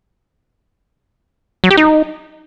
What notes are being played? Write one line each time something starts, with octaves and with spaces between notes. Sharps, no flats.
F#3
G4
D#4